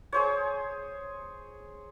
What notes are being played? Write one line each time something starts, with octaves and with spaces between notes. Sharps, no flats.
G#4 C5 C#5